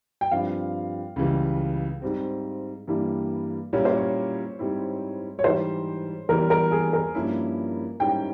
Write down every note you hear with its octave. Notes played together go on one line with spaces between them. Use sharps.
G5
G2 F3 C4 F5
C#2 C#3 E3 G3
G#2 G3 C4
G2 E3 G3 A#3 E4
A#2 G3 A#3 C#4 E4 C#5
C5
C#5
G#2 G3 C4 E4
C#5
G#2 E3 G3 C5
E2 E3 G3 A#4
A#4
G#4
A#4
G2 F3 A#3 C#4 E4
G#2 G3 C#4 E4 G5